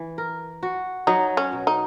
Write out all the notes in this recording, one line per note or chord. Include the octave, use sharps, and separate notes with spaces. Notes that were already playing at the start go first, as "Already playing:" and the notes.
Already playing: E3
A#4
F#4
F#3 D#4
C#4
B2
D#4